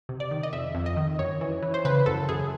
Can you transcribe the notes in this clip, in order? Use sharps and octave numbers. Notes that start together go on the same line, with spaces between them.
C3
D5
D#3
D#5
F2 E5
F2
D#5
D#3
F#2 C#5
E3
E3
C5
C#3 B4
F#2 A4
F#2 G#4